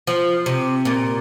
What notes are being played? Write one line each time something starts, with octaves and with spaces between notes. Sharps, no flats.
F3
C3
A#2